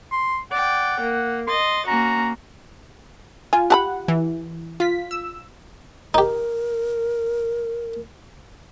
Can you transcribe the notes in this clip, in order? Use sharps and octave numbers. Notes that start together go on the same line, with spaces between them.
C6
D5 F#5 G5
A#3
D#5 C6 A6
A#3 C#4 F#4 A#5
F4 G#5
G4 F#5 A5 B5
E3
F4 B6
E6
D#4 G4 A#4